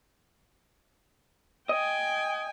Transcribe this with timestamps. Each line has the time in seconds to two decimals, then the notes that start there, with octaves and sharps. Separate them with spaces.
1.69 D#5 G5 G#5